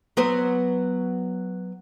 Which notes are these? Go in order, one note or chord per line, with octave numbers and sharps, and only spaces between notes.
F#3 B3 C5